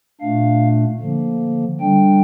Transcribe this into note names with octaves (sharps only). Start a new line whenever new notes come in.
A#2 A3 D4 F5
D3 F3 A#3
D3 G3 D4 G5